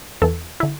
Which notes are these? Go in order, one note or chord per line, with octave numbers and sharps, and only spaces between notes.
E2 E3 A4
D3 E4